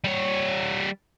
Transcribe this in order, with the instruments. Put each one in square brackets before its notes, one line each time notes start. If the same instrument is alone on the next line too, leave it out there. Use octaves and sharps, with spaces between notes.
[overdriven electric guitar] G3 C#5